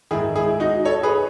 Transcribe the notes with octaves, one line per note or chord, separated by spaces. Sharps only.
G#2 D#3 E4 G#4
E4 G#4
D#4 F#4
A4 C#5
G#4 B4